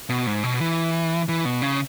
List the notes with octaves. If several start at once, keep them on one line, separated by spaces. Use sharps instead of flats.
B2
G#2
B2
E3
E3
B2
C#3